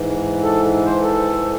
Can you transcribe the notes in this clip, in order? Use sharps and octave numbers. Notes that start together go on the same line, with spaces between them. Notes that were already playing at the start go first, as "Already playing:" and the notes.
Already playing: G#2 E3
A4
C5
A4